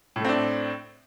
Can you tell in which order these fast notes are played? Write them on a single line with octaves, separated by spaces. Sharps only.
A2 A3 C4 D4